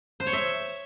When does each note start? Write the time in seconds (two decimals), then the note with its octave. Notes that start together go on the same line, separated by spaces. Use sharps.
0.20 C5
0.27 C#5
0.33 E5